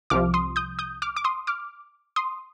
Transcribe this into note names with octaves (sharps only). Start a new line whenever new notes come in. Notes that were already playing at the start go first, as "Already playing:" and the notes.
C2 C3 F3 D6 F6
C6 D#6
D#6 G6
D#6 G6
D6 F6
D6
C6 D#6
D6 F6
C6 D#6